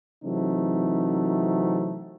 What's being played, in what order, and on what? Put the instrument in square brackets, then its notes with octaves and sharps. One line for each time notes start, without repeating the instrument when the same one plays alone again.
[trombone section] C3 E3 F#3 A3 C4 D#4